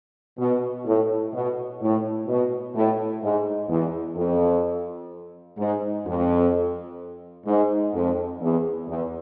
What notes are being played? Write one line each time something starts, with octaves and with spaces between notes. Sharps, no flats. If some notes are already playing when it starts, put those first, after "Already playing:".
B2
A2
B2
A2
B2
A2
G#2
E2
F2
G#2
F2
G#2
F2
E2
E2